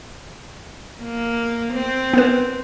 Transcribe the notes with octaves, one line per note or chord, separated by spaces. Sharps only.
A#3
C4
B3 A#4 B4